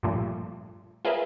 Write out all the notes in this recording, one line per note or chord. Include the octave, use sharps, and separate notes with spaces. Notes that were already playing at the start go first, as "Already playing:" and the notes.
G2 A#2 F3 A3
F4 G#4 A#4 B4 E5